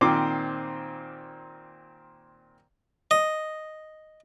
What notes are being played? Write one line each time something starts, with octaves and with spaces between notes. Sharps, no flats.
A#2 D#3 C4 C5 D6
D#5